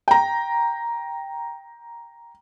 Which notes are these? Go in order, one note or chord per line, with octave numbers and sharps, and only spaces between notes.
G5 A#5